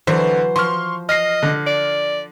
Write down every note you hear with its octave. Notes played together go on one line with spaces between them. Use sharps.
D3 E3 F#3 C5
F3 C6 C#6 F6
D#5 F6 A#6 C7
D3
D5